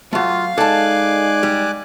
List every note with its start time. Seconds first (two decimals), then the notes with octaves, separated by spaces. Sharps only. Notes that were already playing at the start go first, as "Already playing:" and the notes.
0.13 F#3 A3 F4 F5
0.58 G#3 D#4 A4 D5 G#5 A5 D6 F#6
1.43 G3